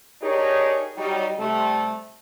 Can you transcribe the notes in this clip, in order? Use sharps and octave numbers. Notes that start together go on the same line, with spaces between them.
D4 D#4 G4 G#4 A#4 C#5
F#3 G3 D#4
C3 G3 A3